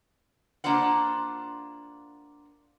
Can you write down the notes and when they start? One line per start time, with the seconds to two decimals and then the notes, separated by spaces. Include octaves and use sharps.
0.64 A#3 D4 F4 C5 F#5